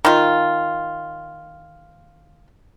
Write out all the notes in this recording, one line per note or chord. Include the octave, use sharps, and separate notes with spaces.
D#3 F4